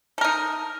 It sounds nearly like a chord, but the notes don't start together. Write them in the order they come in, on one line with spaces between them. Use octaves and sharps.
A4 A#4 D#4